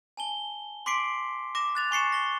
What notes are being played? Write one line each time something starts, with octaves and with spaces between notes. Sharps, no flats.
G#5 A5 G7
C6 D6 B6 C7 D7
D6 A#6 E7
F#6 A6 F7
G#5 C#6 C7 C#7 E7
A#6 G7